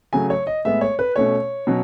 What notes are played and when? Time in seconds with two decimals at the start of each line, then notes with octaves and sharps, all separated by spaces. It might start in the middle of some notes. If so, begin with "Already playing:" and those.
0.13 C#3 F#3 A3 G#5
0.30 C#5
0.47 D#5
0.65 A2 G#3 B3 E5
0.81 C#5
0.99 B4
1.16 B2 A3 C#4 C#5
1.67 B2 F#3 C#4